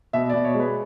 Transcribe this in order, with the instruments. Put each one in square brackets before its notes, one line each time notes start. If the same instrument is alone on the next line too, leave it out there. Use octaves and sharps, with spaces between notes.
[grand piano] B2 E5
B2 D5
C#5
G#3
B4